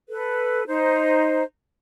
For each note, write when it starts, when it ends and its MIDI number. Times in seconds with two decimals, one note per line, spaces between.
0.09 0.62 69
0.09 0.62 71
0.67 1.42 63
0.67 1.42 72